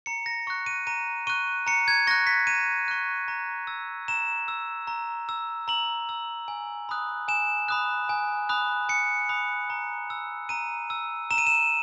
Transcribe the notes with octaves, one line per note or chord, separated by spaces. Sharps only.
A#5 C#7
A#6
C#6 F#6
D#7
A#5 D#7
C#6 F#6 D#7
A#5 C#7
G#6
C#6 F#6 A#6
B6
A#5 D#7
C#6 F#6
A#5
E6
A#5 E7
E6
A#5
E6
A#5 F#7
E6
G#5
B5 D#6 F#6
G#5 E7
B5 D#6 F#6
G#5
B5 D#6 F#6
G#5 C#7
B5 D#6 F#6
A#5
E6
A#5 D#7
E6
A#5 E7
D#7
E7